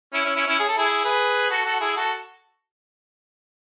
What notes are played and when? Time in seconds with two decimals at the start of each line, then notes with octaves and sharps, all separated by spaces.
0.13 C#4 E4
0.25 C#4 E4
0.36 C#4 E4
0.47 C#4 E4
0.60 G#4
0.68 A4
0.77 E4 G#4
1.04 G#4 B4
1.50 F#4 A4
1.65 F#4 A4
1.80 E4 G#4
1.97 F#4 A4